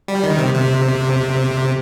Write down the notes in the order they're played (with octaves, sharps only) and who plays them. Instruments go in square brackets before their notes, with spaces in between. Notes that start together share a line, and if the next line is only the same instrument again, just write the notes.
[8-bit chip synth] G3
D#3
C3
C3